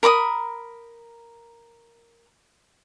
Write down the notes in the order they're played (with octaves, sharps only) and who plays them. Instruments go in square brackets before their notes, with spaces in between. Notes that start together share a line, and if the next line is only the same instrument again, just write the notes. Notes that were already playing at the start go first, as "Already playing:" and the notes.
[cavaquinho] A#4 B5 D6 D#6